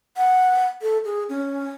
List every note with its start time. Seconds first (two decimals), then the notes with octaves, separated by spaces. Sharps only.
0.17 F#5
0.82 A4
1.05 G#4
1.29 C#4